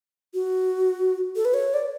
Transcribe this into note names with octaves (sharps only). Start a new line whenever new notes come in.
F#4
A4
B4
C#5
D5